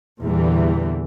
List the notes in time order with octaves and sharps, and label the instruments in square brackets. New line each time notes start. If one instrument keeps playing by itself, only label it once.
[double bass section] E2 A#2 D3 E3 G3